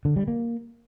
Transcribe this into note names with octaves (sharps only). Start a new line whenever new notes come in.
D3
G3
A#3